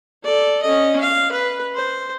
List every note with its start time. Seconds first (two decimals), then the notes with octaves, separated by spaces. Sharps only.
0.24 A4 D5
0.63 C#4 D#5
1.00 F5
1.32 B4
1.74 C5